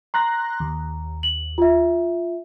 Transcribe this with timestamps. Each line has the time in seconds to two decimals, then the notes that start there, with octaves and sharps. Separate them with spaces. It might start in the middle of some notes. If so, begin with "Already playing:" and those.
0.14 A#5 C6 F#6 A#6
0.60 D#2
1.23 F#7
1.58 F4 E5